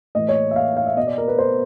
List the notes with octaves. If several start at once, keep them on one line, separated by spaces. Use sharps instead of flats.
A2 E3 D#5
C#5
E5
F5
F5
E5
B2 D#5
D5
A#4
B4
C5